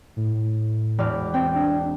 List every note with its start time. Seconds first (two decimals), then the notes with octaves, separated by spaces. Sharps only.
0.16 A2
0.98 E1 D5 F6
1.34 C4 G5
1.54 D4